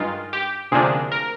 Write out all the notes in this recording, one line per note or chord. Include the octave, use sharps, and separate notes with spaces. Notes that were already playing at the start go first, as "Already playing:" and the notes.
Already playing: G2 D#3 G#3 F4
G4
D2 C3 F3 A#3 D4 G#4
A#4